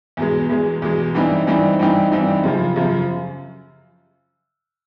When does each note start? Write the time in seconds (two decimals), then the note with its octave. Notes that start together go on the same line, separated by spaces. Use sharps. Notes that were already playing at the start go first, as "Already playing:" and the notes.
0.17 E2 B2 G#3
0.50 E2 B2 G#3
0.82 E2 B2 G#3
1.14 G2 E3 G3 C4 D#4
1.47 G2 E3 G3 C4 D#4
1.79 G2 E3 G3 C4 D#4
2.12 G2 E3 G3 C4 D#4
2.44 F#2 C#3 F3
2.76 F#2 C#3 F3